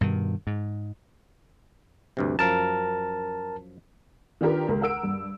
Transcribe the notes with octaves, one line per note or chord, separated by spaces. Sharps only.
G2 B2 D#3
G#2
D2 G2 C3
F#2 F3 A#4 A5
D#3 D4 F4 G4 A#4 B4
C#2 A#4
A#4 F#5 E6 D7
G2